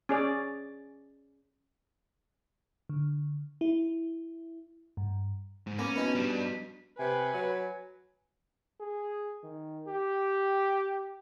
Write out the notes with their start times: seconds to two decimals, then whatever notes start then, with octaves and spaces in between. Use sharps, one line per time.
0.09 C#4 G#4 D5
2.89 D3
3.61 E4
4.97 G2
5.67 G#2
5.79 A#3 B3 C#4
5.96 B2 D#4 B4
6.15 G3 D4
6.99 C3 B4 G#5
7.34 F#3
8.80 G#4
9.43 D#3
9.87 G4